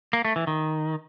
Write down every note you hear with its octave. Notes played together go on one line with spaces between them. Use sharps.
A#3
A3
E3
D#3